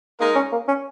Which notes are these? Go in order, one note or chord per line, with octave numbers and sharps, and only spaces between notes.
G#3 A#3 D#4 A#4
C#4
A#3
C#4